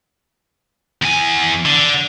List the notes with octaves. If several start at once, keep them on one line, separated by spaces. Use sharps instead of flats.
E2 G#5
D3